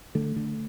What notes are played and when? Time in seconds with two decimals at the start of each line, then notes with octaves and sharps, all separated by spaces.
0.15 D3 A3
0.36 D3